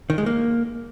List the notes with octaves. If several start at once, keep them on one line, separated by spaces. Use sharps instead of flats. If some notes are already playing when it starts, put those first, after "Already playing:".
D#3
G#3
A#3